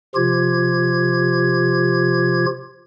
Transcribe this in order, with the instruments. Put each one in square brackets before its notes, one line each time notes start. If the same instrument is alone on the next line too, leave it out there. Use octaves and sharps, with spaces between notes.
[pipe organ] C3 F3 F4 G4 G#6